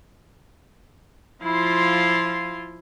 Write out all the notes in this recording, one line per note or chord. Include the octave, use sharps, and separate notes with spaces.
F3 E4 F4 C6